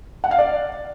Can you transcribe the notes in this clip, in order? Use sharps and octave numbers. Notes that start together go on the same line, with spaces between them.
F#5
F5
D5